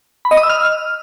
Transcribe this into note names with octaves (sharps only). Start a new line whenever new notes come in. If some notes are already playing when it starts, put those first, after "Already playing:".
B5
D#5
D#6
E6
F6